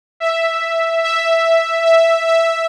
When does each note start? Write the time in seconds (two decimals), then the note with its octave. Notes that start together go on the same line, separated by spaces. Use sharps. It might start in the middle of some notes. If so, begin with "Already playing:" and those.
0.20 E5
1.04 E5
1.86 E5
2.27 E5